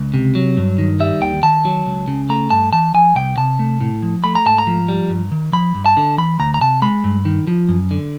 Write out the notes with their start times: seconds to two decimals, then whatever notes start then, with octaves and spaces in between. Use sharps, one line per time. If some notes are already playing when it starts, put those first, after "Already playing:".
Already playing: C#2
0.14 C3
0.35 F#3
0.57 G2
0.78 D#3
1.00 G3 E5
1.21 D#2 G5
1.43 D#3 A5
1.65 F#3
1.87 C#2
2.08 C#3
2.29 A3 A#5
2.50 G2 A5
2.73 E3 A5
2.94 F3 G#5
3.16 C2 G5
3.37 C3 A5
3.59 A3
3.81 A2
4.03 F3
4.24 A3 B5
4.35 A#5
4.46 G#2 A5
4.58 A#5
4.67 F3
4.89 G3
5.10 G2
5.32 D#3
5.53 F3 B5
5.75 G2
5.86 A5
5.97 D3
6.18 E3 B5
6.40 D2 A#5
6.54 A#5
6.61 C3 A5
6.82 G#3 B5
7.04 G2
7.25 D#3
7.47 F3
7.69 F#2
7.91 D3